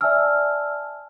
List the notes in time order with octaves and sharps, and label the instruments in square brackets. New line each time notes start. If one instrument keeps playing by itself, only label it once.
[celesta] D5 E5 G#5 A5 E6 F6